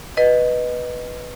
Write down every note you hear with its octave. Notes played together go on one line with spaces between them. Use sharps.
B4 D#5